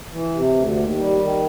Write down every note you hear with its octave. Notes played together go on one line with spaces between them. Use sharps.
E3
C3
D2
D#2
G3
D#3